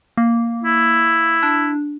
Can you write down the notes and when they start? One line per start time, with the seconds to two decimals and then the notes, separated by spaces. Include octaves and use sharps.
0.17 A#3
0.63 E4
1.43 D4